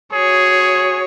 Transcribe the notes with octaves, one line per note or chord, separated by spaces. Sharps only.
F#4 G#4 C#5